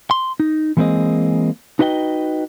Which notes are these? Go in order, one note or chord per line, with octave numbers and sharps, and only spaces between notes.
C6
D#4
E3 G#3 A#3 C4 G#4 D#5
D#4 F#4 B4 D#5 G5